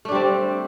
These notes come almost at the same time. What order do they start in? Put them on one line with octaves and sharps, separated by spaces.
A3 D4 G3 C4